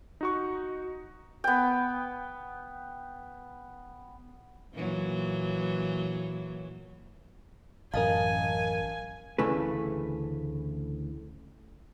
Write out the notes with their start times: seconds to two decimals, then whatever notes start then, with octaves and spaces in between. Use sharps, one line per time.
0.21 D#4 F#4 C#6
1.44 B3 G5
4.74 A#2 E3 F#3
7.94 A1 F#2 A#4 D#5 F5 G#5 A5
9.38 D2 C#3 E3 A3 B4